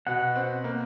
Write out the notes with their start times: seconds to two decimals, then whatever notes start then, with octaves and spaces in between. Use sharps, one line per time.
0.07 B2 F#5
0.36 C4
0.64 A#3